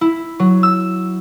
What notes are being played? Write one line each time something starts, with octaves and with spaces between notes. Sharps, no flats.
E4
F#3
E6